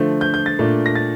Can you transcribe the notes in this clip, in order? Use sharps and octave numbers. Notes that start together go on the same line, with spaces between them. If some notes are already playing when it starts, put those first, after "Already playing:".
Already playing: D3 F3 A3
G6
G6
A6
A#2 A3 D4
A#6
A6